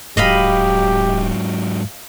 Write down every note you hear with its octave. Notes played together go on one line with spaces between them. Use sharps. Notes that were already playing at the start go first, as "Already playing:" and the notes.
D1 G#2 F#3 G4 D#5 F5 B5